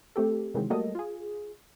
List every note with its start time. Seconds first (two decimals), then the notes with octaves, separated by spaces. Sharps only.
0.16 A3 C4 G4 A4
0.54 C3 D#3 E3 F#3 G#3 C4
0.70 F#3 G3 A3 A#3 A4 D#5
0.95 F4 G#4